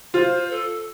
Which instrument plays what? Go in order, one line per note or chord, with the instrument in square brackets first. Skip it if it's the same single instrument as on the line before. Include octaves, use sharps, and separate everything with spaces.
[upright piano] F4 [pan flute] C5
[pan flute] A4